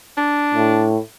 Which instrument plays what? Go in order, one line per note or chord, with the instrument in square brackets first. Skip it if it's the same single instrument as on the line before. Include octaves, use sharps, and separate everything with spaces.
[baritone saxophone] D4
[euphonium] A2